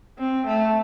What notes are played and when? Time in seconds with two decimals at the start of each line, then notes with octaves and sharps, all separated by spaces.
0.19 C4
0.46 A3